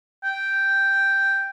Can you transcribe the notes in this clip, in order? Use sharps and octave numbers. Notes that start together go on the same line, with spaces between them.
G5